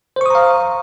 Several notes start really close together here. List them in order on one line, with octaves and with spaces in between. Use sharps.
C5 C#6 D#6 A#5 F5